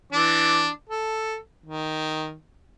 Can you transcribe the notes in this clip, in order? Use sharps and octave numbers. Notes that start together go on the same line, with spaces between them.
E3 D4 D6
A4
D#3